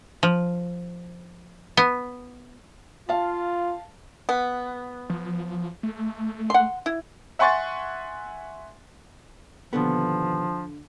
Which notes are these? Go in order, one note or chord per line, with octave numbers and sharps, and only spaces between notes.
F3
B3
F4 F5 A5
B3
F3
A3
F#5 C6
E4
E5 F#5 G#5 C6 C#6 A6
D#2 B2 D3 F3 B3